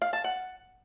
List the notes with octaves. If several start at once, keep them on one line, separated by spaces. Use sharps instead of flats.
F5
A5
F#5